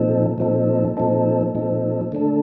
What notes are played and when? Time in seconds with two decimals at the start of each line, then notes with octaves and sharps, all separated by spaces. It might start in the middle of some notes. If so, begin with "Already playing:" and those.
Already playing: A#2 F3 C4 D#4 A4
0.38 A#2 F3 C4 D#4 A4
0.97 A#2 F3 C4 D#4 A4
1.55 A#2 F3 C4 D#4 A4
2.12 D3 A3 D4 A4